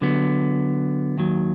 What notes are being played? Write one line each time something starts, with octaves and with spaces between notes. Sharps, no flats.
D3 F#3 B3
D#2 D#3 F#3